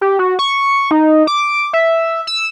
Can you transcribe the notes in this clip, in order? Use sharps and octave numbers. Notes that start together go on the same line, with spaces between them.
G4
F#4
C#6
D#4
D6
E5
E6